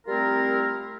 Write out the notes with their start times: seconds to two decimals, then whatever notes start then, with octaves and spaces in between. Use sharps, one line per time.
0.07 G3 A3 C4 E4 F4 A#4